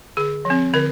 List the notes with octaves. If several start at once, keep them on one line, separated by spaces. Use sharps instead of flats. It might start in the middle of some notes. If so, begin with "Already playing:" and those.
D3 G#4
F3
C4
D3 A#4